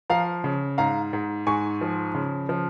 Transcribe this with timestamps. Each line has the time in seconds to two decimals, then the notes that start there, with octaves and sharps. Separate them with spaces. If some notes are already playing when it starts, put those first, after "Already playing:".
0.10 F3 F5 A#5
0.44 C#3
0.78 G#2 F5 A#5
1.13 G#2
1.47 G#2 G#5 C#6
1.81 F3
2.15 C#3
2.49 F3